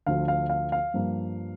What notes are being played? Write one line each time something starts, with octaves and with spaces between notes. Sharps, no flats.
D2 D3 F3 F5
F5
F5
F5
G2 F3 A#3